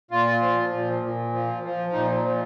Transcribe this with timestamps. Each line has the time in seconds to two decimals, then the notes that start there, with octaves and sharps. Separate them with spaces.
0.11 A#2 F4
0.41 F3
0.72 A#2
1.02 A#2
1.33 F3
1.63 F3
1.93 A#2 D#4
2.23 F3